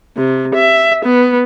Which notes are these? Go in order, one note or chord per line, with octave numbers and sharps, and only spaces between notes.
C3
E5
B3